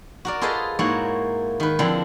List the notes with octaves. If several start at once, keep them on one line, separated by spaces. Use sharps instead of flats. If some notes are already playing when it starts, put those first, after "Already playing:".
F#4 A#4 D5
F4 G#4 A4 B4 C5 D#5
G#2 A#3 E4 F#4 C#5
D#3 B4
D3 F3 C4 D4 E4